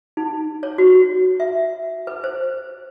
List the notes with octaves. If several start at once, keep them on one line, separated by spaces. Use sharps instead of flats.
D#4
C#5
F#4
E5
B4
C5